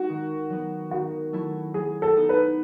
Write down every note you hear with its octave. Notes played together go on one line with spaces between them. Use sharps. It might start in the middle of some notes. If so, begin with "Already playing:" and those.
Already playing: G#3 D#4 F#4
D#3
F#3 B3
D#3 F#4
F#3 A3 E4
F#3 G#4
A4
B3 D#4
B4